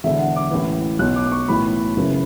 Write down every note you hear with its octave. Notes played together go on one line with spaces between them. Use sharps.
E1 E2 D3 E5
F#5
D6
A1 A2 E3
B1 B2 F#6
D6
D6
C#6
B1 A2 E3 B5
F#1 F#2 C#3 E3